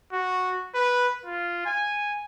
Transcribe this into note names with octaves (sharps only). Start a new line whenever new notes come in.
F#4
B4
F4
G#5